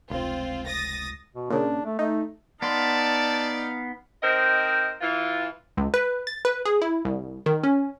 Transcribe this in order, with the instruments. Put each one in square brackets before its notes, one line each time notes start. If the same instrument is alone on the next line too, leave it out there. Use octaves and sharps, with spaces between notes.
[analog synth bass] F1 [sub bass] C#2 [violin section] C4 F4
[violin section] D#6 A6 A#6
[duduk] B2
[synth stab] A#2 C#3 [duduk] D4
[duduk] A3
[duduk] A3 [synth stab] D#4
[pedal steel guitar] B3 C6 [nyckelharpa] D#4 F5 [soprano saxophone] D5 [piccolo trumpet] A5
[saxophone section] C4 D#4 A#4 C5 D#5
E3 F4
[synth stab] C#2
B4
A6
B4
G#4
E4
C2
D#3
C#4